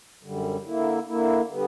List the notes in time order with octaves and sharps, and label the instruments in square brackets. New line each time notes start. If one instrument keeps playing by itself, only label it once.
[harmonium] F#2 D3 G3
D3 A#3 E4
D3 A#3 E4
D3 G3 B3